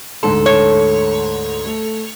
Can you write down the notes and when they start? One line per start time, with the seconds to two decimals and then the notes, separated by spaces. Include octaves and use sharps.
0.23 D2 G#2 A4 C6
0.46 C#5
1.65 A3